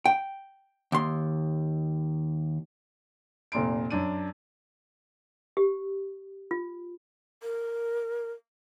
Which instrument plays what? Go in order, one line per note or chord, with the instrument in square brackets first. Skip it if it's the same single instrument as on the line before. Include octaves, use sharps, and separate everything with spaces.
[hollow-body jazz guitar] G5
D#2 C6
[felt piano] F1 A#2 C6 D7
F#2 D4 D#7
[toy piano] G4
F4
[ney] A#4